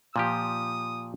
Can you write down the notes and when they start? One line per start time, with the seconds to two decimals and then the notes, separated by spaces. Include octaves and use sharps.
0.16 A#2 F3 G4 D#6